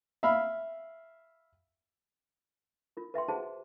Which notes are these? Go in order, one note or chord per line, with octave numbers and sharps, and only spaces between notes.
E5 F5 B5
F4 A#4
B4 E5 G5 C6
F#4 G#4 C5 F#5 A5